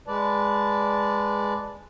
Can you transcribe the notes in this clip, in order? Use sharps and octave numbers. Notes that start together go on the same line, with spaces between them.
G#3 B4 D5 A5